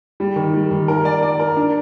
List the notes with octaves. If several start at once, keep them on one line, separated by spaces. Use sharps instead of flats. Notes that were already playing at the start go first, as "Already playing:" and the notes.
G3
D#3
G3
D#3
A#4
D5
D5
A#4
D4